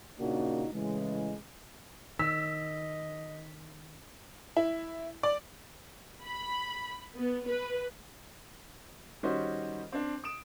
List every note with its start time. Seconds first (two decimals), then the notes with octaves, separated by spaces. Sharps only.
0.19 A#2 C#3 A#3 D4 D#4 F#4
0.73 A2 C#3 E3 G#3
2.19 D#3 D#5 E6 B6
4.57 E4
5.23 D5
6.25 B5
7.18 B3
7.48 B4
9.23 D#3 G3 C#4 F#4 C5 D#5
9.92 C4 D4
10.24 D#6 D7 E7